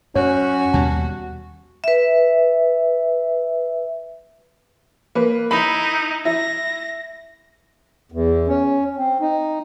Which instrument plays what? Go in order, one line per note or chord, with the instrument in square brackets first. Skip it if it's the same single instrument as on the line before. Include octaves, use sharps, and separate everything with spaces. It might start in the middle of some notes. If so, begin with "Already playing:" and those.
[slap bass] F#2 [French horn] C#4 [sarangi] F#4 [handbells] C#5
[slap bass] D#2 B2 G3 [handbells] A5
[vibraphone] B4 E5
[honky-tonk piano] A#3 B4
[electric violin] D#4 E4 [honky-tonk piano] B5
[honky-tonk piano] E4 [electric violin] A#6
[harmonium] E2
C#4
C4
D#4